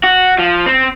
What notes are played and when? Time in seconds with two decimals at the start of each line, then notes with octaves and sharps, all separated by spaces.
0.04 F#4
0.39 F3
0.66 C4